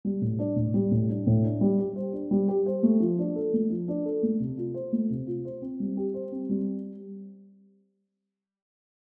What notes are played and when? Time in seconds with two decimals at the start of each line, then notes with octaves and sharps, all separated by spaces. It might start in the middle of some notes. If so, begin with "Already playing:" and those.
0.05 G3
0.21 A2
0.39 D4
0.56 A2
0.74 G3
0.91 A2
1.09 D4
1.27 A2
1.44 D4
1.61 G3
1.79 G4
1.96 C5
2.13 D4
2.31 G3
2.48 G4
2.66 C5
2.83 A3
3.00 F3
3.19 D4
3.36 A4
3.53 A3
3.70 F3
3.88 D4
4.06 A4
4.23 A3
4.40 C3
4.58 F4
4.74 C5
4.92 A3
5.10 C3
5.27 F4
5.45 C5
5.62 C4
5.80 G3
5.97 G4
6.14 C5
6.32 C4
6.49 G3